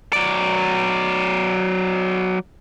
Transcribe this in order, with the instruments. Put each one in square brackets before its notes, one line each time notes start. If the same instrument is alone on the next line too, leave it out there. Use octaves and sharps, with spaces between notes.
[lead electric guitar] F#3 D5